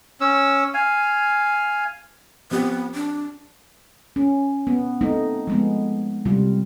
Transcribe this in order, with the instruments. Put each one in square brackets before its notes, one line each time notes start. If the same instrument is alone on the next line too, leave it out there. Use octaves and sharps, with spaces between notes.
[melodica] C#4 E6
F5 G#5
[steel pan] F3 C4 G4 [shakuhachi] B3
[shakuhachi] D4
[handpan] C#4
B3
A3 C4 D#4
F3 G#3 B3
C3 G3 F4